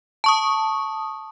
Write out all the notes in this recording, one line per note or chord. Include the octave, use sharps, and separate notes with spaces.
A5 C#6 D#6